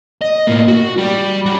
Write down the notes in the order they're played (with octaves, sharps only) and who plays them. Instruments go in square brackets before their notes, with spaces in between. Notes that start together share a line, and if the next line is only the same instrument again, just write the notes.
[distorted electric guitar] D#5
A2 A#3
F#4
G3
C#4 F#4